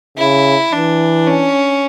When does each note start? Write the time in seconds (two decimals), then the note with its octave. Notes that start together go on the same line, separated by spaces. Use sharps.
0.18 C#3 E4
0.72 E3 D4
1.27 C#4